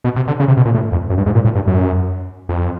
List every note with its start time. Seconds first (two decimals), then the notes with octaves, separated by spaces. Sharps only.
0.04 B2
0.16 C3
0.28 D3
0.40 C#3
0.48 C3
0.57 B2
0.65 A#2
0.74 A2
0.92 F2
1.10 F#2
1.18 G2
1.26 G#2
1.35 A#2
1.45 A2
1.55 G2
1.67 F#2
2.49 F2